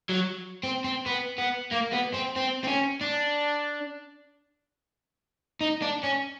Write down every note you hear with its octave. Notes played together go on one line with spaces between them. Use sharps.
F#3
C4
C4
B3
B3
A#3
B3
C4
C4
C4
C#4
D4
D#4
D4
C#4